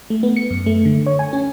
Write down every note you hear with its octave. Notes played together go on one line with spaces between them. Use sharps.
A3
B3
C#7
F#2
A3
D3
C#5
G#5
C#4